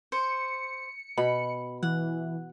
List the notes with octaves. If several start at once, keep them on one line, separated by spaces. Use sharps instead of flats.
C5 C#7
B2 B5
E3 F#5